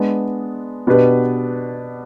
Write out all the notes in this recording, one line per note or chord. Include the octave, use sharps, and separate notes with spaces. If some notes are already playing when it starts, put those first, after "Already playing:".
Already playing: G#3 B3 D4
B2 B3 D4 G4 B4